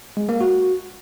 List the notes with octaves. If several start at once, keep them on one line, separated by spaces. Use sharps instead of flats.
G#3
A#3
F#4